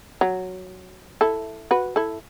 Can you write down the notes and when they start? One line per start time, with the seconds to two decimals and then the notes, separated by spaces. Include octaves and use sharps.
0.21 F#3
1.21 E4 A4
1.71 F#4 B4
1.96 E4 A4